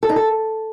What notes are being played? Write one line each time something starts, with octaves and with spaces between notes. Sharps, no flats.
A4
D#4
A4